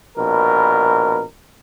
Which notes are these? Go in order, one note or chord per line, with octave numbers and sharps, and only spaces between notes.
A#1 B2 A#4